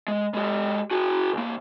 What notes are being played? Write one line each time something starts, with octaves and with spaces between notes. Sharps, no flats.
G#3
G#3 G4
F#4 G#4
C2 A#3